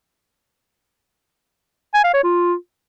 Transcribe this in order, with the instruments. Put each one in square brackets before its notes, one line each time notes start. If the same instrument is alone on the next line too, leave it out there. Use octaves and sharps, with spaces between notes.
[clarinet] G#5
F5
C#5
F4